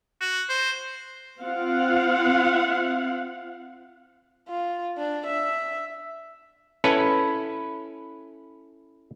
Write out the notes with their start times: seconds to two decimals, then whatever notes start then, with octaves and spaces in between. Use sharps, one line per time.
0.20 F#4
0.49 C5
1.43 C4 F4 F5 F#5
4.49 F4
4.98 D4
5.27 E5
6.84 C#4 E4 A4 B4